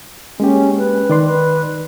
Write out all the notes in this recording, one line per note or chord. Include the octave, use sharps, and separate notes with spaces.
G#3 A#3 C#4 G4
B4
D#3 D5 C6
B4